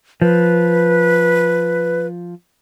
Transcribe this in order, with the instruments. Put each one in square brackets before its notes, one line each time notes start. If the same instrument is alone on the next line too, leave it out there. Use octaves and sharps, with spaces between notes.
[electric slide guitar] F3 [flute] B4